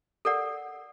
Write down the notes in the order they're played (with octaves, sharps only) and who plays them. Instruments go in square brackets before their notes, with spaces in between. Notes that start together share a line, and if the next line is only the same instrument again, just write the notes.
[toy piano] A4 A#4 D5 F#5